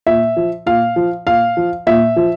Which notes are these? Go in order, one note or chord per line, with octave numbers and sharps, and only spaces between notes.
A#2 E5
F3
A#2 F5
F3
A#2 F5
F3
A#2 E5
F3